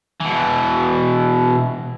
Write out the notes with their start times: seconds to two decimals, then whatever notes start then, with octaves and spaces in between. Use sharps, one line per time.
0.20 B2 E3